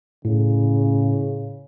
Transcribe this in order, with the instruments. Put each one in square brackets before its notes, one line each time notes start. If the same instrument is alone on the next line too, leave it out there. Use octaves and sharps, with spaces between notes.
[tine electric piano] A2 [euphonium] C#3